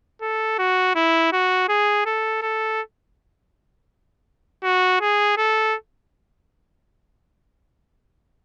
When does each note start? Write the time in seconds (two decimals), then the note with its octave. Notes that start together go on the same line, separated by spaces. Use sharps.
0.22 A4
0.59 F#4
0.95 E4
1.32 F#4
1.69 G#4
2.06 A4
2.42 A4
4.63 F#4
5.01 G#4
5.37 A4